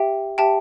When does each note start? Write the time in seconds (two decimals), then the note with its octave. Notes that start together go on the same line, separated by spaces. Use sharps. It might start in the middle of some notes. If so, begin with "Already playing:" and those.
Already playing: G4 E5 G5
0.38 G4 E5 G5 A5